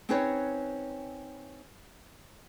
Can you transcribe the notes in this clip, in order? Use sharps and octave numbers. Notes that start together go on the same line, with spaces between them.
C4 C#4 D#4 G#4 B4 C#5